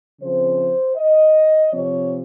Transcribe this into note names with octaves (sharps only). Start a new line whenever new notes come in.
C#3 F3 C4 C5
D#5
C3 F3 C4 C#5